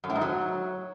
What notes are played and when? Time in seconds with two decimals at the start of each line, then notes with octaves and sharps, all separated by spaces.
0.04 F#2
0.10 A2
0.15 G#2
0.21 F#3